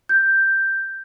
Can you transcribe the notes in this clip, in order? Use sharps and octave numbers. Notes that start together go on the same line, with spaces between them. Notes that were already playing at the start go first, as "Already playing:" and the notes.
G6